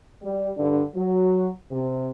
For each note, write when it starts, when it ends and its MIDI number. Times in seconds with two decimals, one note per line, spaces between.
0.23 0.49 55
0.57 0.81 43
0.57 0.81 50
0.57 0.81 62
0.96 1.49 54
1.71 2.11 48